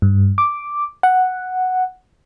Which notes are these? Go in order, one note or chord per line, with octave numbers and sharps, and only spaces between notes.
G2
D6
F#5